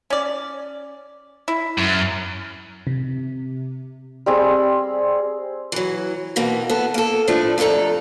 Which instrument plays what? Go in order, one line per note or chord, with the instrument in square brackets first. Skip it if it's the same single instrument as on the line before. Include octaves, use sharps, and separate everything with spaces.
[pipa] C#4 D5
E4
[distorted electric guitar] F#2
[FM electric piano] C3
[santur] G3 C4 G#4
[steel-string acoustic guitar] E3 F#3
B2 E3 A#3 C4
B3 A4
A#3 A4
A2 F3 A3 D4
F2 C3 D4 A4 A#5